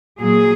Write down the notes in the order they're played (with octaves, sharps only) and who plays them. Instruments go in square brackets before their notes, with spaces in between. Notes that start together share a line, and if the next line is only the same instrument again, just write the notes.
[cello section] A#2 F#3 G#4